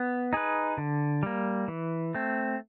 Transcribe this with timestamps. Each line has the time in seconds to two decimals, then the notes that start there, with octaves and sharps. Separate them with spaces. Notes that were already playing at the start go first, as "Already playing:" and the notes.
Already playing: B3
0.33 D#4 G#4 B4
0.78 D3
1.23 G3 A#3
1.68 E3
2.14 A3 C4